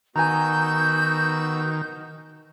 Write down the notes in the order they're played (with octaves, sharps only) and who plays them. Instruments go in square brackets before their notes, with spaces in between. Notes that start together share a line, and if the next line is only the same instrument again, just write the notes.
[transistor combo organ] D#3 [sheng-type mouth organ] B3 F#4 E6 [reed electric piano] G#5 A#5 [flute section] G6